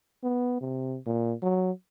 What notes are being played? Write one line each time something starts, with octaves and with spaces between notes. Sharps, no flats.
B3
C3
A#2
F#3